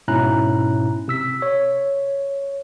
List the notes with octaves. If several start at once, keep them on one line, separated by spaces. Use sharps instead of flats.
G#2 B2 C#4 E4 A#5 F#6
C3 E6 B6
C#5